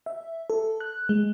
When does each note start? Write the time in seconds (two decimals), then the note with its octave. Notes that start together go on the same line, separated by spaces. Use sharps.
0.06 E5
0.50 A4
0.80 F#6
1.09 G#3